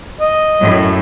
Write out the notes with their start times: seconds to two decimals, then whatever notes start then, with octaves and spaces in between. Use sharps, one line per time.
0.20 D#5
0.62 F#2 A2